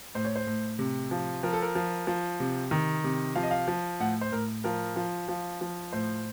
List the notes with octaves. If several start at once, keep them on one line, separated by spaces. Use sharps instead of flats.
A2 C5
C#5
C5
A2
C3
F3
F3 A#4
A4
A#4
F3
F3
C3
D#3
C3
F3 F5
D#5
F5
F3
A2 F#5
C5
A2 A#4
F3 A#4
F3
F3
F3
A2 C5